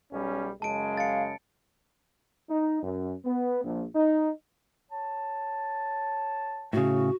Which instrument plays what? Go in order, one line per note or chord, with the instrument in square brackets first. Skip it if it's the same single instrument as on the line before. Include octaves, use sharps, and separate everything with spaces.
[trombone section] B1 G3 C#4
[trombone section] F#2 C#3 G#3 [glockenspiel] A5 D7
[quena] F5 [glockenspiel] A6 C#7
[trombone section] D#4
F#2
B3
A#1
D#4
[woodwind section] C#5 A5
[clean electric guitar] A2 C#3 [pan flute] F#4